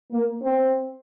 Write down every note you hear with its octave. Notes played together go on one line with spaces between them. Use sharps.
A#3
C4